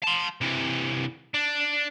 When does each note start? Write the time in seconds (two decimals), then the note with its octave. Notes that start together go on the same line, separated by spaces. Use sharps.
0.03 A5 C6
0.41 C3 E3
1.34 D4